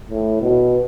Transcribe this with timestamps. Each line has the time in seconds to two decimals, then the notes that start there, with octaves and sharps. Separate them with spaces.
0.09 A2
0.41 B2